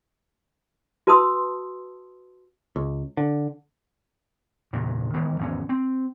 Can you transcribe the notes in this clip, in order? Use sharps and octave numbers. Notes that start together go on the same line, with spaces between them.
F#4 B4 A5 C6 D#6 E6
C#2
D3
E2 G2 A#2 C#3
D#3 E3 G#3 B3
G#1 E2 C#4
C4